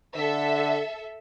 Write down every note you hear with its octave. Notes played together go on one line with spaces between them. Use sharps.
D3 A4 E5